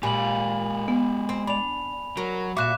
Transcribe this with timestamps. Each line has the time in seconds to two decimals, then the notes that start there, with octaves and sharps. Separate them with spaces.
0.03 A#2 G#3 G4 G#5 B5 F#7
0.88 B3
1.29 C4
1.47 D4 B5 F7
2.17 F#3 A#4
2.57 A#2 F#4 E5 D6 F#6 E7